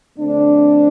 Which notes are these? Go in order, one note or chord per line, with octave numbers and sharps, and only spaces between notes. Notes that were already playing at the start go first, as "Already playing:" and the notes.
F2 D3 A3 C4 D4